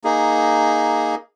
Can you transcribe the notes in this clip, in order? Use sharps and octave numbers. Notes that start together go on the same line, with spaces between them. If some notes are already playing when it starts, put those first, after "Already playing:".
A#3 D#4 G#4